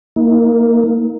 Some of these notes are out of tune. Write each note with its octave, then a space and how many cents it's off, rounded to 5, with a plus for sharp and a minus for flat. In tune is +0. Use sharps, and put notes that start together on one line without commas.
A#3 +0 D#4 +40